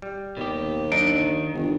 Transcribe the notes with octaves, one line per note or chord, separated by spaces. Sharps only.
G3
D#2 B2 G4
F#2 D4 D#4 D7
D#3
G1